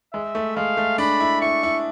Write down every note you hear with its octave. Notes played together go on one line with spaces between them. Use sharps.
G#3 E5
A3
G#3 F5
A3
D4 B5
E4
E4 C#6
E4